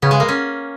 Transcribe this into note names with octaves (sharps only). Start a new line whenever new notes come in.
C#3 B3
G#3
A#3
C#4